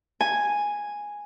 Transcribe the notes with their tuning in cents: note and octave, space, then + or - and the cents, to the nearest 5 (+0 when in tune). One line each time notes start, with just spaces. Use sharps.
G#5 -5